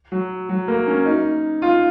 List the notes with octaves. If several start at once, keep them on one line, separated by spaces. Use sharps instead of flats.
F#3
F#3
A#3
C#4
D#4
F4